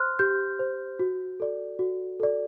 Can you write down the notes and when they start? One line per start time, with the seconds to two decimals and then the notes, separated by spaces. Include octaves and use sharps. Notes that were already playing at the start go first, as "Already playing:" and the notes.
Already playing: C5 C6 F6 F#6
0.19 G4 G6
0.59 C5
1.00 F#4
1.40 A4 D5
1.79 F#4
2.20 A4 D5